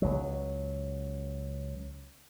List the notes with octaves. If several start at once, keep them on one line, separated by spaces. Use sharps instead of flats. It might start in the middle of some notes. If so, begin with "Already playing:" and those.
C#2 F#3